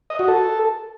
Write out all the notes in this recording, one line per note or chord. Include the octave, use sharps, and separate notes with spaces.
D#5
F#4
A4